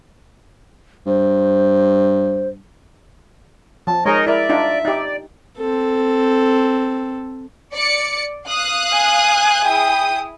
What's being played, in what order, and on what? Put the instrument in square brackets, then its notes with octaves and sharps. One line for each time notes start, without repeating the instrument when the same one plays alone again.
[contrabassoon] G2 [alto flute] C5
[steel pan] F3 [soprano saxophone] A5
[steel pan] G#3 G#4 [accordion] D#4 A#4 D#5 [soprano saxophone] C#5
[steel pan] E4 A#4 [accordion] D5 [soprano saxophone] E5
[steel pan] D4 D#4 F4
[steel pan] D#4 G4 [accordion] D5
[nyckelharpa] C4 A4
[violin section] D5 C#7
F5 D#6 F#6
[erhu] G#5
[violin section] E4 G#4 D#6 [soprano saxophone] G5